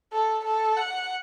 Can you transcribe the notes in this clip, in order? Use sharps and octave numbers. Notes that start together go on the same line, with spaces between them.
A4
A4
F#5